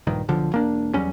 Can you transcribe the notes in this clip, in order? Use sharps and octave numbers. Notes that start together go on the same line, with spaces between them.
A#1 G2 D#3
B1 D3 F3
E1 A#3 D4
E2 F#3 G3 C#4